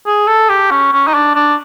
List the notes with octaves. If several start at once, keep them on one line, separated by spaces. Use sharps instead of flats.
G#4
A4
G4
C#4
C#4
D#4
D4
D4